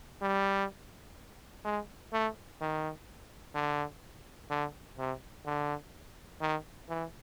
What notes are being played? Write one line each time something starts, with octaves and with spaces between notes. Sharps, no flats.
G3
G#3
A3
D#3
D3
D3
C3
D3
D#3
E3